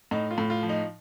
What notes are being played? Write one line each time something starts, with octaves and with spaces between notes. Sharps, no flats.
A2 D#4
F4
A2
F4
F3
D#4